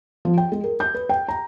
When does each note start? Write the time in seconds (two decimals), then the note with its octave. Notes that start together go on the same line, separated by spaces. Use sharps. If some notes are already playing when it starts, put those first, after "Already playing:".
0.25 F3
0.38 G5
0.52 G#3
0.64 A#4
0.80 G6
0.95 B4
1.09 G5
1.28 A#5